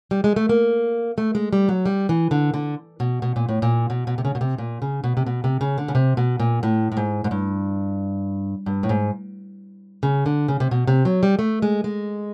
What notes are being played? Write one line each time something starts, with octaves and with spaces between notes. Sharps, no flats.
G3
G#3
A3
A#3
A3
G#3
G3
F#3
G3
E3
D3
D3
B2
B2
A#2
A2
A#2
B2
B2
C3
C#3
B2
C3
A#2
C#3
B2
C3
B2
C3
C#3
D3
C#3
C3
B2
A#2
A2
A2
G#2
G#2
G2
G2
A2
G#2
C#3
D3
C#3
C3
B2
C3
F#3
G3
A3
G#3
G#3